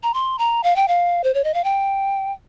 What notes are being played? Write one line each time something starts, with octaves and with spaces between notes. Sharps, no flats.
A#5
C6
A#5
F5
G5
F5
C5
C#5
D#5
F5
G5